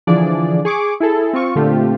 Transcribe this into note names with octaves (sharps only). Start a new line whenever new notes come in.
D3 E3 F3 D4 G#4 D5
G#4 C#6 D6
E4 G#4 A4
C4 F4 C#6
A#2 D3 A3 C4 F4 G4